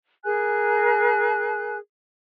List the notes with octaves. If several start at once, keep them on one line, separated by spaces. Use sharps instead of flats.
G#4 A#4 G#5 F#6